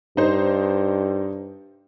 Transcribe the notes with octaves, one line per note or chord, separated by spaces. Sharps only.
G2 D#4 C5